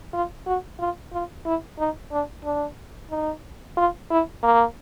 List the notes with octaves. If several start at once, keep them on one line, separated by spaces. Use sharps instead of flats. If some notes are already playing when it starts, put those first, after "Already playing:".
F4
F#4
F4
F4
E4
D#4
D4
D4
D#4
F4
E4
A#3